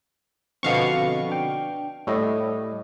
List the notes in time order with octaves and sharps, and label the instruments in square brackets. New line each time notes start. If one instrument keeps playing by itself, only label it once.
[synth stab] B2 F5 C#6 [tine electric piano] D3 F3 C4
[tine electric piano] D4 G5
[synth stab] A2 [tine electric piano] G3 A3 D#5